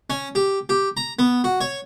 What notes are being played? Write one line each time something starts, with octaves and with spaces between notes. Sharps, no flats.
C#4
G4
G4
A#5
B3
F#4
C#5